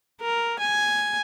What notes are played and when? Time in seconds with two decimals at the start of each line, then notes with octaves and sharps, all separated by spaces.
0.21 A#4
0.59 G#5